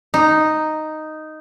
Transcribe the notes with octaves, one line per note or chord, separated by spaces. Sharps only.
D#4